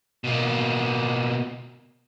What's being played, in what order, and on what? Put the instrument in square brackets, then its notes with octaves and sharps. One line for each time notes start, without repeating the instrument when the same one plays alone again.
[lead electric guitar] B2 A#3